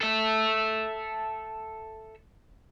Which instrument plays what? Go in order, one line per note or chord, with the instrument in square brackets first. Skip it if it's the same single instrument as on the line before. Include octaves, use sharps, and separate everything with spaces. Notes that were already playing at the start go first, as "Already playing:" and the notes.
[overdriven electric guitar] A4 E5